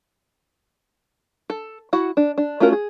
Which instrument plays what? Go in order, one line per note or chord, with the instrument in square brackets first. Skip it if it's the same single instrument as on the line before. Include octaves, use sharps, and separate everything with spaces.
[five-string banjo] A4
E4 F#4 F#5
D4
D4
A3 C#4 F4 F#4 A#4
G#4